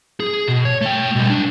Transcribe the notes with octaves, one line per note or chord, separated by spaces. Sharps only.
G#4
B2
C#5
A3 G5
B2 G3
B1 D4